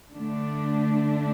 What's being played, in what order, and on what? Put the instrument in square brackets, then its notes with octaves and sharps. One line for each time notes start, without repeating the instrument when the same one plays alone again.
[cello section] D3 A3 D4